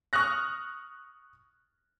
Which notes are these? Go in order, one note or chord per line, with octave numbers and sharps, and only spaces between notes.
C#6 D#6 F6 F#6 A#6